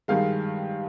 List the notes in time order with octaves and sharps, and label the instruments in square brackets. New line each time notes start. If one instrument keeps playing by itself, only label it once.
[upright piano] G2 D#3 G#3 F5